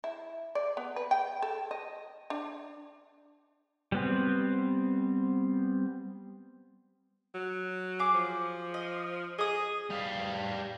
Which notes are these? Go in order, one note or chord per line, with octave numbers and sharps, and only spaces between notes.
E4
D5
B3
B4
G5
A4
D#5
D4
G3 B3 C4
F#3
G#4 D6
F3
D#5
G#4 D#5 D#6
G3 F5